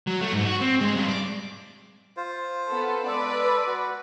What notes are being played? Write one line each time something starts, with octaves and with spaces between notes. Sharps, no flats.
F#3
A3
G#2
F#4
C4
G#3
G2
D5
F4 C5
B3 A4
G#3 A4 B4 D5
F#4